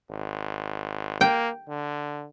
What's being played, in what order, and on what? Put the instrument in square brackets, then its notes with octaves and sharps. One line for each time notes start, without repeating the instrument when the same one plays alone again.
[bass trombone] G#1
[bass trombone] A#3 [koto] G5
[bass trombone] D3